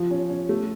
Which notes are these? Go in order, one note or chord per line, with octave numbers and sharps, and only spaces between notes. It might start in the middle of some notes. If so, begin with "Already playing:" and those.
Already playing: F3
C#4
C#4
A3